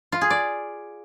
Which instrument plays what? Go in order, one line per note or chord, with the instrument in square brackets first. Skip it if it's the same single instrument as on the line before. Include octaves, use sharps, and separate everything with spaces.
[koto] F4
G#4
D5